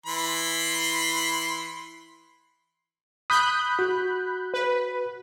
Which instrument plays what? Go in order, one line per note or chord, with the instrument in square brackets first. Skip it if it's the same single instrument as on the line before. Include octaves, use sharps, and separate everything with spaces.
[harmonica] E3 B5 C6
[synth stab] B5 F#6 G6 [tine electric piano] D#6
[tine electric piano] F#4
[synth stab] B4